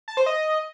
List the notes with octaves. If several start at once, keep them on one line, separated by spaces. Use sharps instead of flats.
A5
C5
D#5